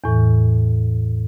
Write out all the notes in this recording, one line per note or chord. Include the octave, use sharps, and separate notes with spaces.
E2 A2 E3